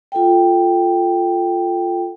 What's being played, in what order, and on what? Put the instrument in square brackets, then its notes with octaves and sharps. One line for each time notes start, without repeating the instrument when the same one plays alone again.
[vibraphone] F4 A4 F#5 G5